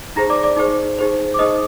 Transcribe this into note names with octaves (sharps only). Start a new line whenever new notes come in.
D#4 G#4 C5 A#5 A#6
D5 D6
D5 D6
D#4 G#4 C5
D#4 G#4 C5
D6
D#4 G#4 C5 D#5 D#6